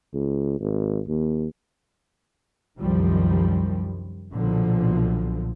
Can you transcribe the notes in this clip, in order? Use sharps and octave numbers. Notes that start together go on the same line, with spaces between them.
C#2
G#1
D#2
C2 F#2 D#3 F3 G3
B1 A#2 D3 F3